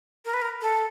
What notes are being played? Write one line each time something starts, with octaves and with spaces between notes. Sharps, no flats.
A#4
B4
A#4
A4